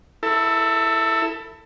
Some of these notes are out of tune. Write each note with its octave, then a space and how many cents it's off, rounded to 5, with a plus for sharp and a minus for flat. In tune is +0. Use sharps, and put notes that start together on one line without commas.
E4 +0 A4 +25